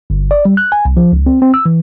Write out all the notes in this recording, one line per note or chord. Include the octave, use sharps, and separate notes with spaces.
G1
D5
G3
F#6
G#5
C2
F3
C#2
C4
C4
E6
E3